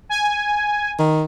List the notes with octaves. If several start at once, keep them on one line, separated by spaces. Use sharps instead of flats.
G#5
D#3